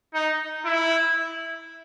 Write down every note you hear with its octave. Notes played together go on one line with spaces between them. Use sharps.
D#4
E4